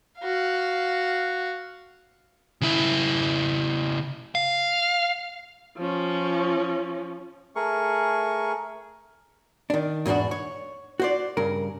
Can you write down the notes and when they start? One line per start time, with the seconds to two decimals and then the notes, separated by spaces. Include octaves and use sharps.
0.20 F#4 F5
2.61 C#3 E4
4.35 F5
5.77 F3 C#4
7.56 A3 G#4 A#4 C#6
9.70 D#3 D4
10.06 E2 G#2 B2 D4 F#4
10.31 C#5
11.00 F#4 C5 D5
11.37 G2 C#3 A#4